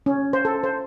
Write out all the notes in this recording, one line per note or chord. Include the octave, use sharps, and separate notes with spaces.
C#4
C5
A4
C5